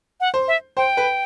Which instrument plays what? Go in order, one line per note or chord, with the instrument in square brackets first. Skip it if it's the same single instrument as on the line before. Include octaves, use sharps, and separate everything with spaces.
[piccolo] F#5
[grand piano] C5
[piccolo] E5
[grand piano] C5 [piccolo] G5
[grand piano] B4